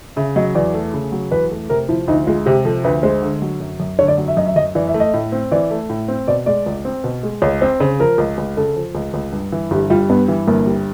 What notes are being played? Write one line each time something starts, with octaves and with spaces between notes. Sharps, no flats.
C#3 E5
F#3 D#5
E2 D5
A3
C#3
F#3
E2 B4
A3
C3 A#4
F3 E4
D2 D#4
G#3 F4
C3 G4
F3 A4
D2 B4
G#3 C5
D3
F#3
F#2
F#2
D3 C#5
D5
F#3
E5
F#2 D#5
E5
F#2 D#5
E3 D5
E5
A3
D#5
A2
C4
E3 D5
A3
A2
C4
B2 D5
G#3 D5
C#2
C4
B2
G#3
C#2 C#5
C4 C5
C#3 C5
F3 A#4
C#2
C#2
C#3 A4
F3
C#2
C#2
G2
E3
G1 G4
G3 F4
G2 B3
E3
G1 A#3
G3